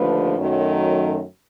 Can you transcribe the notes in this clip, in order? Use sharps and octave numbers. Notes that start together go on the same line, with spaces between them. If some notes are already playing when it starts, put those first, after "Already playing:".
Already playing: D#2 D3 F3 A3 B4
F#2 D#3 F#3 A3